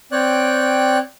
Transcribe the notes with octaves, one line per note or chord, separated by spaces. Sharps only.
C4 C#5 D5 G5 F#6